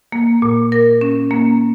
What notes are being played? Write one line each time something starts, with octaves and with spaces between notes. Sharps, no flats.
A#3
A#2
A#4
C#4
A#3